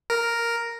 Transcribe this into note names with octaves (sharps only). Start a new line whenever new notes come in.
A#4